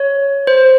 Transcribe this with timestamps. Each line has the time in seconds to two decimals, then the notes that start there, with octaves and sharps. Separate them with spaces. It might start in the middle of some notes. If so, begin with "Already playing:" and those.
Already playing: C#5
0.47 C5